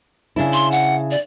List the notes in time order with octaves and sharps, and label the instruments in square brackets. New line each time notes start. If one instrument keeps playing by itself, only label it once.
[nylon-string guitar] C#3 D4 E4
[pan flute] C6
F#5
D5